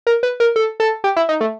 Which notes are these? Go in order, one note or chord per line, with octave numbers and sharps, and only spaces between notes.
A#4
B4
A#4
A4
A4
G4
E4
D#4
A3